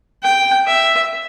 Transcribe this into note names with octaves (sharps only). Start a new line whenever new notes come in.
G5
E5